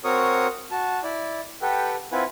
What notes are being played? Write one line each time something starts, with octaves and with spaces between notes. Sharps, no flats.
C4 F#4 A#4 C#5 C#6 D#6
F#4 A5
E4 D5
G4 A4 B4 F#5 G5
C4 E4 F4 B4 F#5 G#5